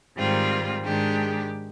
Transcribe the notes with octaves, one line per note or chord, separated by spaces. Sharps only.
G#2 D#3 G3 C4 F4
G#2 D#3 G#3 D4 G4